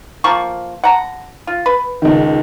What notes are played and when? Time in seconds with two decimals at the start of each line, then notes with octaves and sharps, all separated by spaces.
0.24 F3 A#3 C#6
0.84 F#5 A#5
1.47 F4
1.66 B4
2.02 C#2 D#3